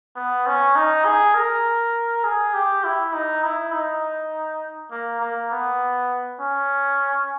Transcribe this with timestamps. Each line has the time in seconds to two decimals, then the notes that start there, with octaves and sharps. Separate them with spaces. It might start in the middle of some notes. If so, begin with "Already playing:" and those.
0.16 B3
0.47 C#4
0.76 D#4
1.05 G#4
1.35 A#4
2.24 G#4
2.54 G4
2.84 E4
3.13 D#4
3.44 E4
3.73 D#4
4.91 A#3
5.21 A#3
5.52 B3
6.41 C#4